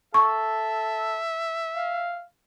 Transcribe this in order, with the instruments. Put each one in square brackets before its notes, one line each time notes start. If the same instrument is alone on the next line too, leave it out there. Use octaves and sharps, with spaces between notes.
[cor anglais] A4 [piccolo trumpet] E5 [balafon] C#6
[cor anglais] F5